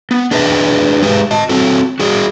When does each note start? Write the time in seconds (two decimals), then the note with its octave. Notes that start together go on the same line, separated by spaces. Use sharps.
0.11 B3
0.31 D4 G#4 B4 D#5 E5
1.02 G#3 G4 G#4 B4
1.31 D#5 A5
1.49 C4 F#4 A4
2.00 F#4 G#4 D5